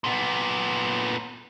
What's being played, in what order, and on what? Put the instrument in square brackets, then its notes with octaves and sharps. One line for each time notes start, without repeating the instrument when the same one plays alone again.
[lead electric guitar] A#2 B3